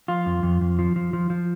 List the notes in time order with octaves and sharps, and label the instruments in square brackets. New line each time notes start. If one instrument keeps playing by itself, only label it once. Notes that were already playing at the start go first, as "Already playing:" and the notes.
[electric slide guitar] F3 F4
F2
F2
F2
F3
F3
F3
F3